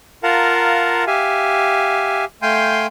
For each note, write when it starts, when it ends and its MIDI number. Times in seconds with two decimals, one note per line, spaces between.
0.23 1.04 65
0.23 1.04 70
0.23 1.04 77
0.23 1.04 78
0.23 1.04 81
0.23 1.04 82
1.07 2.25 67
1.07 2.25 76
1.07 2.25 77
1.07 2.25 80
2.42 2.87 57
2.42 2.87 77
2.42 2.87 79
2.42 2.87 80
2.42 2.87 84
2.42 2.87 91